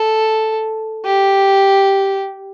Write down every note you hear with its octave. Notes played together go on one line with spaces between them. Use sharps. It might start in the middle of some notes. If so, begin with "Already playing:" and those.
Already playing: A4
G4